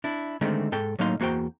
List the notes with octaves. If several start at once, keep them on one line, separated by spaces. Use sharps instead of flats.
D4 E4
D3 D#3 G#3 A3 C4
G#2 A4 G5
A2 F#3 A#3 D#4 F5 C6
E2 A#3 F#4 C5 G5